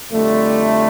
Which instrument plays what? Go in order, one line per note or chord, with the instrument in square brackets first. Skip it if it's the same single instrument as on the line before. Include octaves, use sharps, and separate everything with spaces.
[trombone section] F2 D3 G3 A3